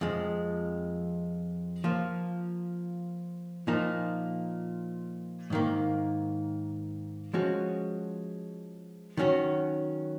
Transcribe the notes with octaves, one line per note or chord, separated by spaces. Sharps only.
F2 F3 G#3
F3 A#3 F4
A#2 F3 A#3 D#4
G#2 D#3 A#3
F3 G#3 C#4 F#4
D#3 F#3 C#4 F#4